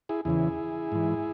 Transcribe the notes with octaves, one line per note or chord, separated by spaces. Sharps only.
E4 G#4
E2 C#3 E3 E4 G#4
G#2 E3